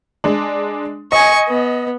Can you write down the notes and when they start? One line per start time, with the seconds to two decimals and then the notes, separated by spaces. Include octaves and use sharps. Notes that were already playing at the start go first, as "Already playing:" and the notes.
0.24 G#3 D4
1.12 D#5 G#5 C#6
1.48 B3